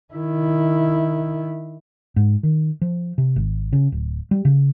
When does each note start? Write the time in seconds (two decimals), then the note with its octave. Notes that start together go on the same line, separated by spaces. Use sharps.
0.14 D#3 E4
2.16 G#2
2.43 D#3
2.81 F3
3.18 C3
3.36 G#1
3.73 C#3
3.92 D1
4.31 G3
4.45 C#3